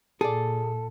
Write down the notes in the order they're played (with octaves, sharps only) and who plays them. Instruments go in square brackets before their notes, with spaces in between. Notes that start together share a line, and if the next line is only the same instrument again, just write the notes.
[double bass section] A#2 [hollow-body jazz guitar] G#4 D5 [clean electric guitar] A4